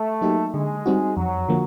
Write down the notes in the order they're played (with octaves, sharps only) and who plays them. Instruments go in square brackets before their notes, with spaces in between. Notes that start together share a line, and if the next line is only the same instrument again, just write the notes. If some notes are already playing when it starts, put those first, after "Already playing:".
Already playing: [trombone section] A3
[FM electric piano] F#3 A#3 D#4 G4
[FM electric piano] D3 [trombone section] G#3
[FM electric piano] G3 C4 D#4 F#4
[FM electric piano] F2 [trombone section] F#3
[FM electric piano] D3 F3 A#3